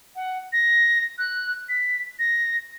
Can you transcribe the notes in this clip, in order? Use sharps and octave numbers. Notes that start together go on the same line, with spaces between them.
F#5
A#6
F#6
B6
A#6